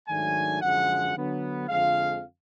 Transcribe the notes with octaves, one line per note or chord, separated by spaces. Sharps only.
G#2 D#3 F#3 A3 D4 G#5
F#2 D3 F3 G#3 F#5
D3 F#3 B3
F2 D3 F3 G#3 F5